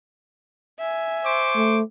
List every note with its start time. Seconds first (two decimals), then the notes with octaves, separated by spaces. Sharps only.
0.79 E5 G#5
1.25 C5 C#6 D6
1.56 A3